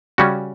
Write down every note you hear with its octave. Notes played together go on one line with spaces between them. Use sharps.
C#3 G3 C#4 F#4